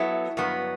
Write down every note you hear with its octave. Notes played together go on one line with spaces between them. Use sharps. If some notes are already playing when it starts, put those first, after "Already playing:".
Already playing: F#3 B3 E4 A4
G2 F#3 B3